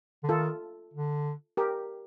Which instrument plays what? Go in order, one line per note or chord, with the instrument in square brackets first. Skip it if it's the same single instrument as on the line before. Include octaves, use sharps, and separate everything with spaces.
[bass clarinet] D3
[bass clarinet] D#3 [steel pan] F4 A4
[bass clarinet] D3
[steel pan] G4 A#4